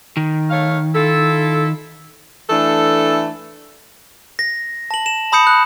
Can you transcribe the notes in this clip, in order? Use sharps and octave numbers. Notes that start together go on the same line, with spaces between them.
D#3
A3 C#5 F5
E4 F4 A4
E3 A3 D4 A4
A#6
A5 F#7
E7
A5 B5 D#6 G6 C#7
F#6